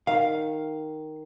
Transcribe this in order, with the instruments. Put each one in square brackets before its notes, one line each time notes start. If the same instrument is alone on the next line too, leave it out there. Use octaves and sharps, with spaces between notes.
[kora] D#3 [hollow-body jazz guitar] F5